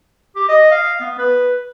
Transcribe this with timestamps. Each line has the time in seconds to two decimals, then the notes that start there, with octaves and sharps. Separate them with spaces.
0.36 G4
0.49 D#5
0.71 F5
1.01 B3
1.18 B4